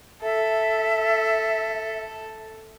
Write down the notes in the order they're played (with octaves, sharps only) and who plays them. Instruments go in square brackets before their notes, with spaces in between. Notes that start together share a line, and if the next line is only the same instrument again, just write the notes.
[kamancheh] A4 [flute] E5